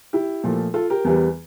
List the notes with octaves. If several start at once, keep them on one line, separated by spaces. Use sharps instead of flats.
E4 G4
A#2 F3 A3
F4 A4
G4 A#4
E2 E3 G3